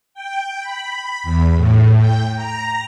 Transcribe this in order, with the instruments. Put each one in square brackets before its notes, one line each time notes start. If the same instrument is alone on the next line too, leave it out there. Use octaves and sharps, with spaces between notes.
[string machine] G5
B5
E2
A2
G5
A#5